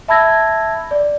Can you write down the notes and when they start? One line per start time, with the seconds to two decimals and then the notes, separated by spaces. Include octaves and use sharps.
0.08 E5 A5 B5 E6 G#6 A#6
0.91 D5